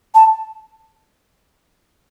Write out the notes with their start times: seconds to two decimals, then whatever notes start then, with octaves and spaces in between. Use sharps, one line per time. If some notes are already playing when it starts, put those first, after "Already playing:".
0.14 A5